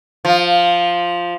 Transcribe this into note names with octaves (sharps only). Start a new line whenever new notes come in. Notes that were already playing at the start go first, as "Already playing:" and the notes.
F3